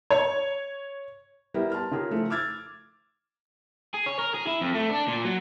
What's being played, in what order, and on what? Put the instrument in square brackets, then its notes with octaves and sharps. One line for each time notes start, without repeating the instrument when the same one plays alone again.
[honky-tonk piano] C#5
[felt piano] G3 B3 E4 A#4
A5 C6 F6
C#3 F4 G4 G#4 A#4
F3 A3
D6 E6 F6 G#6 A6
[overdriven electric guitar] G#4
C#5
A#4
G#4
E4
F2
A3
D4
A#2
F#3